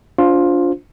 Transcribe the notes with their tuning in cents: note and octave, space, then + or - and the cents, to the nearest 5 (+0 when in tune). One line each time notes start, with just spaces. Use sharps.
D4 -30 F4 +10 C5 +0